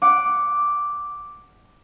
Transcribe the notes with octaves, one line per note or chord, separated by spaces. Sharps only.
F#5 D6